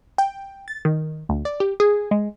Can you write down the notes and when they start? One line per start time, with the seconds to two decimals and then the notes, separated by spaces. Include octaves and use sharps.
0.18 G5
0.68 A6
0.85 D#3
1.29 D2
1.45 D5
1.60 G4
1.80 G#4
2.11 G#3